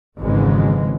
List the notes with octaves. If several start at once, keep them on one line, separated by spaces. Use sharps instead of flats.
G#1 F2 G#2 C#3 E3 G#3